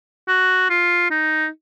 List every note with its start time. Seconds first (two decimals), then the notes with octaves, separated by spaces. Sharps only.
0.28 F#4
0.70 F4
1.11 D#4